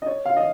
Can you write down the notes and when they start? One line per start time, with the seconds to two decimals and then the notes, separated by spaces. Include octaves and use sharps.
0.02 D#5
0.06 C#5
0.25 F5
0.36 D#5